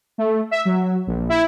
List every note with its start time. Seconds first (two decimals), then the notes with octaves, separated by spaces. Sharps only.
0.18 A3
0.51 E5
0.65 F#3
1.07 A#1
1.29 E4